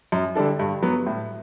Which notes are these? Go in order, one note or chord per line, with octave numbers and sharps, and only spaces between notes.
F#2
D3 G3 D4 A4
G2
F#3 B3
A2